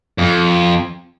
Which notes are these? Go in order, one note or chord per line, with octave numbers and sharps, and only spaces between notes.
F2